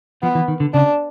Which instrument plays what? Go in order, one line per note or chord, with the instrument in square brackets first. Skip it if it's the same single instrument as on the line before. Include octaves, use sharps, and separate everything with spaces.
[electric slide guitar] F3 [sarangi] B3
[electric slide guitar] E3
D#3
D3
[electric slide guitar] C#3 [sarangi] D4